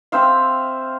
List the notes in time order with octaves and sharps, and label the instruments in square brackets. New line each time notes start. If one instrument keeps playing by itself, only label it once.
[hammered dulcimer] C4 C5 E5 F5